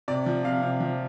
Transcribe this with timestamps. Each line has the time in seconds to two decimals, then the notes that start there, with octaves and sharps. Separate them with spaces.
0.08 C3 D5
0.26 F3
0.44 C3 F5
0.62 C3
0.81 F3